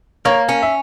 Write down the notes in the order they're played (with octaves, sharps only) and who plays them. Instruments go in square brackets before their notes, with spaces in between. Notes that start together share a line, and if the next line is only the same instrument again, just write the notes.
[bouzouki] A#3 [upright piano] A#4 C#5
[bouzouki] C#4
[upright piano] E5